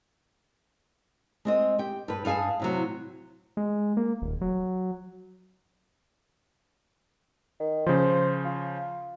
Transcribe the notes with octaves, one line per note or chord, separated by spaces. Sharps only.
G#3 C4 D#5
G4 G5
G2 B4
G2 G#4 F5 G#5 A5
A2 C3 F#3
G#3
A#3
D#1
F#3
D#3
C#3 F3 C5
F4